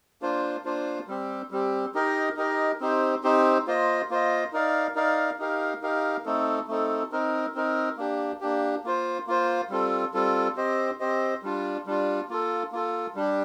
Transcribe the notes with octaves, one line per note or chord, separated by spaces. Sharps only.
A#3 D4 F4 C5
A#3 D4 F4 C5
G3 C4 G4
G3 C4 G4
D#4 G4 A#4 D#5
D#4 G4 A#4 D#5
C4 D#4 G4 C5
C4 D#4 G4 C5
A#3 F4 C5 D#5
A#3 F4 C5 D#5
D#4 A#4 D5 F5
D#4 A#4 D5 F5
D#4 G4 A#4 F5
D#4 G4 A#4 F5
A3 C4 D#4 A4
A3 C4 D#4 A4
C4 D#4 A#4
C4 D#4 A#4
A#3 D4 G4
A#3 D4 G4
A#3 F4 C5
A#3 F4 C5
G3 C4 F4 A4
G3 C4 F4 A4
C4 G4 C5 D#5
C4 G4 C5 D#5
G3 D4 F4
G3 D4 F4
A#3 F4 A4
A#3 F4 A4
G3 D4 G4